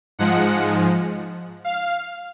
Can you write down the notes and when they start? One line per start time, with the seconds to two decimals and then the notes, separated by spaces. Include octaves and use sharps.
0.19 G#2 F3 G#3 F#5
1.65 F5